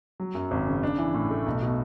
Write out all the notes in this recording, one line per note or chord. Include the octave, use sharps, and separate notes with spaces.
F#3
F#2
G#1
C#3
D4
E3
A2
A3
B1
B2